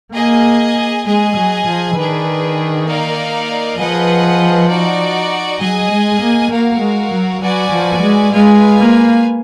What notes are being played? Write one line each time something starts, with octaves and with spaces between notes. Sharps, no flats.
A#3 G#4 D#5 G#5
G#3 G#4 D#5 G#5
F#3
F3
D#3 D4 G#4 B4
A#3 D#4 A#4 D5 F5
F3 G#4 B4 D#5 F#5
D#4 F#4 D5
F#3 G#4 D#5 G#5
G#3
A#3
A#3 F#4 A#4 F5
G#3
F#3
F#3 F#4 B4 D5 G#5
F3
G#3
G#3 F4 B4 F5 G#5
A#3